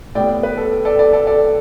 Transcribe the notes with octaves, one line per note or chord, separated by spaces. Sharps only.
A2 G3 B3 D5 G5
B4
A4
A4 D5
A4 D5
A4 D5
A4 D5